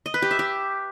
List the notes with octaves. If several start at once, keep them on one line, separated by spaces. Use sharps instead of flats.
D#5
B4
G4
E5
G4